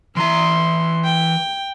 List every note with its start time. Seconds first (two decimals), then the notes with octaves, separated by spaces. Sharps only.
0.17 E3 E4 A#5 C6
1.05 G5